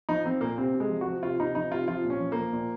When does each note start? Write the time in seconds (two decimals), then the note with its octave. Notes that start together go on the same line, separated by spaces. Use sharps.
0.09 F3 D#4
0.25 F3 C4
0.41 A#2 A#3
0.58 C3 C4
0.74 C3
0.80 G#3
0.90 F3
1.01 F3 F#4
1.23 C3 F4
1.40 C3 D#4
1.55 F3 D#4
1.72 C3 F4
1.88 F3 F4
2.04 A#2
2.10 C#4
2.20 F3
2.32 A#3
2.38 F3
2.53 A#2